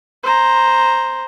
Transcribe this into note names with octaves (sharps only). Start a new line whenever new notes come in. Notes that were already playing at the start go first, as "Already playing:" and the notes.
C5 A#5